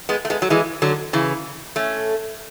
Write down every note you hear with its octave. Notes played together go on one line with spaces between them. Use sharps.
G#3 B3
A3
G#3 B3
F#3
E3 G#3
D3 F#3
C#3 E3
A3 C#4